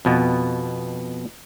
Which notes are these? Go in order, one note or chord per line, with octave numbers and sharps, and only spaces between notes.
F2 B2 B3